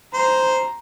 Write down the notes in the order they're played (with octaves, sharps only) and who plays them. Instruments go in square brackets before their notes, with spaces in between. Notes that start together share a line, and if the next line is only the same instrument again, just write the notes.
[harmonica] C5 [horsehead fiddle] A#5